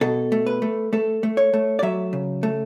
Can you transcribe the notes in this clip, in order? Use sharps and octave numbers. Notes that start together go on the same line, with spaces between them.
B2 A4
A3
B4
A3
A3 A4
A3
C#5
A3
D5
F#3 E5
C#3
A3